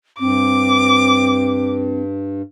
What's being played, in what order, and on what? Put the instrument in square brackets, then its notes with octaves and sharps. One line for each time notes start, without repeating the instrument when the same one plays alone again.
[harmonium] G2 [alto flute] C4 [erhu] D6